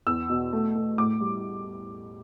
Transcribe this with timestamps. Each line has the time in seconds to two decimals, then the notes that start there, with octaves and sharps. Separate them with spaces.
0.07 E2 E6
0.30 B2
0.53 A3
0.75 A3
0.98 A2 D6
1.21 G3